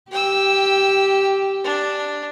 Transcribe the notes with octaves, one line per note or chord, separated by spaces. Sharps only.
G4 G5 E6
D4